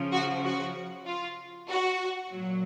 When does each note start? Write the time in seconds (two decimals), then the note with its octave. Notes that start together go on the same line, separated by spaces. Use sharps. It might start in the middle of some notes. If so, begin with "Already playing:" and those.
Already playing: C#3 F3
0.12 F#4
0.44 F#4
1.06 F4
1.68 F#4
2.31 A#2 F#3